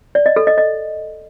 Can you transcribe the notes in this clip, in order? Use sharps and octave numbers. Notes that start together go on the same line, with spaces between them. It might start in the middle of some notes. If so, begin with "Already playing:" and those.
D5
D#5
A4
D#5
D#5